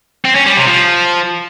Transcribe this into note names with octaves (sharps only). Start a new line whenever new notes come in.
C4
C#4
G3
C3
F3